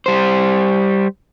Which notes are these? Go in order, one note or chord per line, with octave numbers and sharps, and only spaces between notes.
G3 C5